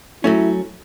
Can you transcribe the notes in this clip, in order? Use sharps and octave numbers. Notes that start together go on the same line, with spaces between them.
F#3 A3 C#4 E4